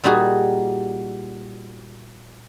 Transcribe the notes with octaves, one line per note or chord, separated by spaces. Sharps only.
A#2 G3 D#4 F#4 G#4